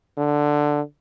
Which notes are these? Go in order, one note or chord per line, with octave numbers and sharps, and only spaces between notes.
D3